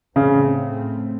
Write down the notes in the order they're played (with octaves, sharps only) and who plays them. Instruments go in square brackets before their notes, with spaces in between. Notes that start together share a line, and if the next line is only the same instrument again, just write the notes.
[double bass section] A2 A3 C4 [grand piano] C#3